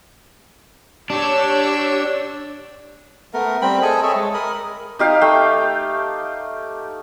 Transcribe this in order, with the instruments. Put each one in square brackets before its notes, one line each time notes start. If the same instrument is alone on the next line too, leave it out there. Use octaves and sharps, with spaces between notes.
[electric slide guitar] D4 [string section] G4 C#5 E6
[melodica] A3 B3 A#4
G3 C4 G5 B5
G#4 A4 D#5 G#5
A4 C#5 E5
G#3
A#4 B5 D#6
[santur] D#4 G4 F5
A3 G5